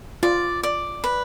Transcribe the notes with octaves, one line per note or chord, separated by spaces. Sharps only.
F4 D5
D5
B4